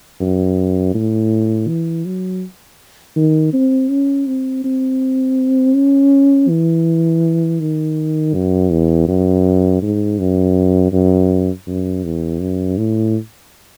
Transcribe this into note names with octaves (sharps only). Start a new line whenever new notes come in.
F#2
A2
E3
F#3
D#3
C4
C#4
C4
C4
C#4
E3
D#3
F#2
E2
F#2
G#2
F#2
F#2
F#2
E2
F#2
A2